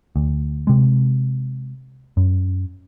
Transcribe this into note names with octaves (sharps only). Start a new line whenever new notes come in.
D2
C3 G#3
F#2